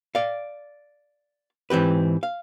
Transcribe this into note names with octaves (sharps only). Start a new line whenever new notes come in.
D5 F5
G#2 E3 C4 G4 B4
F5